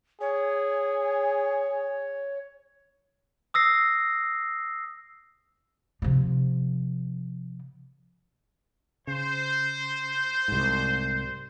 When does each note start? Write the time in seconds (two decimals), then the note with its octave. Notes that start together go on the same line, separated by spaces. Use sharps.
0.21 G#4 C#5
3.54 D#6 E6 A#6 C7
6.02 C3 F3
9.07 C#3 C5
10.48 C2 G#2